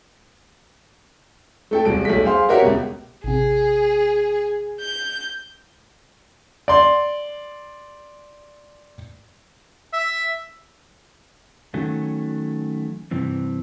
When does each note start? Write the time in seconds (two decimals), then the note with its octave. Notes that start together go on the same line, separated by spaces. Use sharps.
1.71 A3 A4 G5
1.85 E1 C2 D7
2.05 B1 A3 B6
2.24 G#4 C5 F5 C6
2.49 F#4 G4 A#4 C#5 E5 F#5
2.62 C#2 B2
3.24 A1 C3 G#4
4.80 G6
6.68 D5 C6
9.93 E5
11.74 D#3 F#3 A3 C#4
13.11 G2 C3 E3 C4